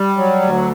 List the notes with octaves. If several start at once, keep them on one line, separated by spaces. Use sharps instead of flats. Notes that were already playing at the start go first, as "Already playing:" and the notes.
Already playing: G3
F#3
D2